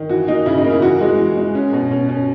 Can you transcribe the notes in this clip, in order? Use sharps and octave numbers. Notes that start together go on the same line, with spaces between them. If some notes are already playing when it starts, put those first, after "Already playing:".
Already playing: D#3
E3 F#4
A#3 D#4
C#3 E4
D#4
A#3
E4
E3 F#4
G#3
E3
G#3
C#4
B2
C#4
C#4